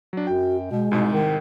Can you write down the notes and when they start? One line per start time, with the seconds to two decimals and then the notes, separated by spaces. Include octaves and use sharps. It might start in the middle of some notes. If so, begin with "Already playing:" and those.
0.13 F#3 D4
0.27 F#2 F#4 G5
0.71 B2 G#3
0.91 C2 G#2 B2
1.13 D#3